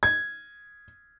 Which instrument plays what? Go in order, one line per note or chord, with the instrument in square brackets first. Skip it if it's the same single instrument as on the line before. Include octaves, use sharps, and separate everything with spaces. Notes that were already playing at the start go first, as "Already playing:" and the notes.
[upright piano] G#6